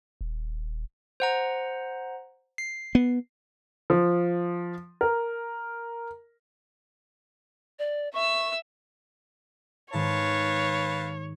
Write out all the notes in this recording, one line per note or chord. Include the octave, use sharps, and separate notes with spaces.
D#1
C5 F#5 A#5
C7
B3
F3
A#4
D5
E5 C#6 E6
G#2 D#3 G#3 B4 C#5 F5 A5